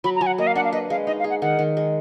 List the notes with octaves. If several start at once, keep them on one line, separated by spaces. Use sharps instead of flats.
F#3 B5
A#5
F#3 G#5
F#5
A#3 D#5
F5
D4 F#5
F5
B4 D#5
G#3 F5
D#4 D#5
F5
G#4
F#5
D#3 F#5
D#3
G#3